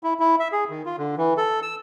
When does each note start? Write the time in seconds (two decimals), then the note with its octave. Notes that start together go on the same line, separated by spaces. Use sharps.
0.03 E4
0.20 E4
0.40 E5
0.52 G#4
0.70 D#3
0.86 F4
0.98 D3
1.17 E3
1.37 A4
1.62 E6